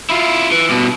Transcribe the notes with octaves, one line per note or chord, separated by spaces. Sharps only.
E4 F4
E3
G2 B2